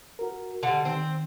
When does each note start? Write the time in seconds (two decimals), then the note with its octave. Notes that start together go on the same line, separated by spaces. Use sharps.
0.19 F#4 A#4
0.63 D3 G3 F#5 A5
0.85 D#3 C4